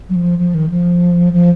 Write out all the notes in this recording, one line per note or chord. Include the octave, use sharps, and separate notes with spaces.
F#3
F3
F3
D#3
F3
F3